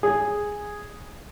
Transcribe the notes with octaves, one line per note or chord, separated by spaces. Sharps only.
G#4